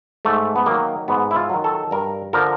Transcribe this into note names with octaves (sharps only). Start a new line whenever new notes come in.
G#2 A3
B3
D#3 F#3 A#3
G#2 B3
E4
F4
D#3 F#3
A4
G2 A#4
D3 F3 A#4